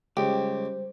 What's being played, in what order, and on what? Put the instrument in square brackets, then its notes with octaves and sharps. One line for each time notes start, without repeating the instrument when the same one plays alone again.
[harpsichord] C#2 [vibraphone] G3 C5 [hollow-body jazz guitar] G4